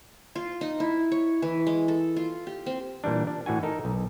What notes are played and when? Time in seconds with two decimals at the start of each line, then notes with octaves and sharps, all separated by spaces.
0.36 F4
0.61 D#4
0.80 E4
1.12 C#5
1.42 E3
1.67 G#3
1.88 A4
2.16 F4
2.47 G4
2.66 C4
3.04 A#2 E3 G3 D4
3.27 D4
3.46 A2 E3 F#4 G#5
3.63 D#4 A4 A#4
3.85 B1